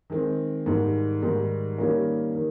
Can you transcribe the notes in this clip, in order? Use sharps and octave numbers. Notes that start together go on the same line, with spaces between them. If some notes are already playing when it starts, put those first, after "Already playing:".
D#3 G#3 C4
G#2 D#3 G3
G#2 D#3 G3
D#3 G3 A#3 C#4
D#3